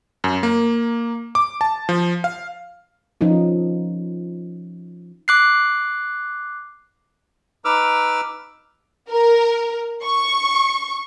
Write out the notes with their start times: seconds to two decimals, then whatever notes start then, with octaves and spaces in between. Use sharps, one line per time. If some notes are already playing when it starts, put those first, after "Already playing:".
0.24 F#2
0.43 A#3
1.35 D6
1.61 A5
1.89 F3
2.24 F5
3.21 F3 C#4 D#4 F4
5.28 D6 F#6 C7
7.65 D#4 B4 D6 E6 F6
9.10 A#4
10.04 C#6